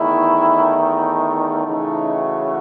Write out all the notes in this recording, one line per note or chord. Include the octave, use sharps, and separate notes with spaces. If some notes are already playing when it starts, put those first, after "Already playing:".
Already playing: E2 D#3 A3 E4
D#4
C#3 E3 A3 D#4
F#4